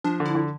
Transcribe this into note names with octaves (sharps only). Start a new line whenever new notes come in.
F3 D4
D3
E4
D3